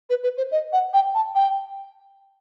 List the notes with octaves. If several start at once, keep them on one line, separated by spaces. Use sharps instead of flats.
B4
B4
C5
D#5
F#5
G5
A5
G5